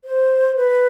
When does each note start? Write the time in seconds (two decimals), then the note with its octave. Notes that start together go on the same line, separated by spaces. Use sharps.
0.05 C5
0.57 B4